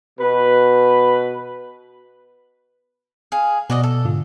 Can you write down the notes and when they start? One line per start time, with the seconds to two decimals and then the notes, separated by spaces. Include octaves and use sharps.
0.20 B2 B4
3.32 G#4 F5
3.70 B2 B3 F#4 D5 D#5
3.83 A4
4.05 G#2 D3 F4